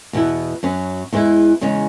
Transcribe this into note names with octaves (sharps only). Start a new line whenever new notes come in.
E2 B2 B3 E4
F#2 F#3 C#4
E2 E3 G#3 E4
E2 C#3 G#3 C#4